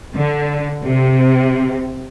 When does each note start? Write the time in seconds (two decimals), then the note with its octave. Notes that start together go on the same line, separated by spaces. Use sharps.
0.15 D3
0.85 C3